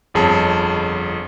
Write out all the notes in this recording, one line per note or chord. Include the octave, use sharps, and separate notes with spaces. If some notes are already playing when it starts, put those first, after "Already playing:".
G1 F2 G#4 C#5 A5